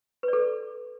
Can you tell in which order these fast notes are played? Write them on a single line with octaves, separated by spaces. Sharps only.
B4 D5 A4